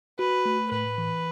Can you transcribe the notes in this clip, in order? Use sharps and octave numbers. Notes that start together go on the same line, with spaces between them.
F#4 B4
A3
A2 B4
E3